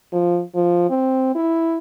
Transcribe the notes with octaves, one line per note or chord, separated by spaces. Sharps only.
F3
F3
C4
E4